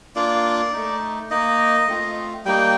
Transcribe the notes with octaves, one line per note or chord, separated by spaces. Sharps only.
A#3 D4 F4 D5
A3 D#4
A#3 D#4 D#5
A3 C4 F4
G3 A#3 D#4 G5